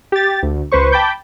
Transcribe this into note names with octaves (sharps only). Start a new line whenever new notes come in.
G4 A6
D2
C#2 B4 C5 C#6
G5 A5 B5 D6 G6